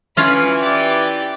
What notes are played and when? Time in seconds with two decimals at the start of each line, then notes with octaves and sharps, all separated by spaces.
0.17 E3 C#4 F4 F5 B5
0.59 G4 D5